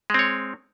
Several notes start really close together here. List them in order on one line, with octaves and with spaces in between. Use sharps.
G#3 C4 C#5